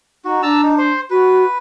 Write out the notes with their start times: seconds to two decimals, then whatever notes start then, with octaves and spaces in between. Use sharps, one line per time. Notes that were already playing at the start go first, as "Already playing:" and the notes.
0.25 D#4 F#4
0.43 D4 A5 A#5 E6
0.63 D#4
0.78 C5
1.10 F#4 B4